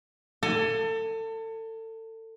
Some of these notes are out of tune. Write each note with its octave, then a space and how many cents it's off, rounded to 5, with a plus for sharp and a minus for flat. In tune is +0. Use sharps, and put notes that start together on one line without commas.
A4 +30 G#5 +10